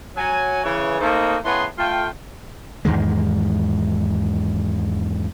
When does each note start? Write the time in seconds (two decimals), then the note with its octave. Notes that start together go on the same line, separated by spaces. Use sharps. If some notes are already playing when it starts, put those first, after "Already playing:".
0.17 F#3 G#5
0.64 C#3 E3 C#5
1.00 A3 A#3 C4 D#4
1.44 A2 C#3 B3 E4 G#4 C6
1.78 A3 F4 G5
2.85 E2 G#2 D#3 G#3